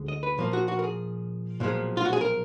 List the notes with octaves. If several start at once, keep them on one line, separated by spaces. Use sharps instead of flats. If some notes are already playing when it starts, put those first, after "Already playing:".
Already playing: D2 D3 G#3
D#5
B4
A#2 F3 A#3
F#4
F#4
A#4
G#4
B1 A#2 F3 G#3
F4
F#4
G#4
A#4